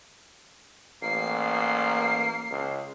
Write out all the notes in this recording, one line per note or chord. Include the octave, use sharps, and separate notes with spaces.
A1 A#3 C7
C#2